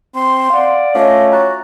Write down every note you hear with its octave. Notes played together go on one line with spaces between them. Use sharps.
C4 C6
D5 F5 F#5
A3 C#4 F4 D#5 F5 D6
F#4 A#5 F#6 A6